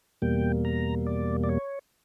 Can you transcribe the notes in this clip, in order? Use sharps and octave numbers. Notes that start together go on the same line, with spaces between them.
E2 B2 G3 A#3 G5
A#5
D5
D5
C#5